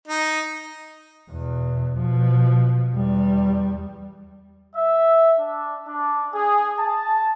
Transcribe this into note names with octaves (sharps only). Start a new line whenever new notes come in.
D#4
E2 B2
B2 F3
E2 G3
E5
D4
D4
G#4
A5